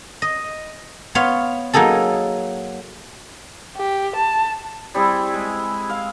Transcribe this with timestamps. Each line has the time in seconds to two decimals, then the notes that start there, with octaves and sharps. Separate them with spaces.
0.22 D#5
1.15 B3 C#5 F5 C6
1.73 F#3 A#3 D#4 G#4 A4
3.77 G4
4.16 A5
4.94 G3 C4 E4 G#4
5.34 G#3
5.90 F5